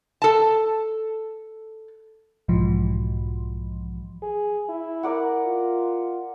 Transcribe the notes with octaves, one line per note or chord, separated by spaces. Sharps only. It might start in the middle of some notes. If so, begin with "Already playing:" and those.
A4 A5
B1 G#2 B2 E3 F3
G#4
E4
A#4 D5 F#5
F4